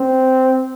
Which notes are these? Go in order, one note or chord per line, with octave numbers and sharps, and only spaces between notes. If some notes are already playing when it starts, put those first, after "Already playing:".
Already playing: C4